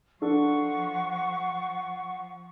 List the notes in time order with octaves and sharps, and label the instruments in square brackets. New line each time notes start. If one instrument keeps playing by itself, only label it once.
[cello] F3 [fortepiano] D4 A4 [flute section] F#5 C#6